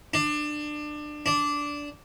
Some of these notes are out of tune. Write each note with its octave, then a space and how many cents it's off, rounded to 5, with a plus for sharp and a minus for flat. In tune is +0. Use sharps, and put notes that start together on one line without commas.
D4 +25
D4 -10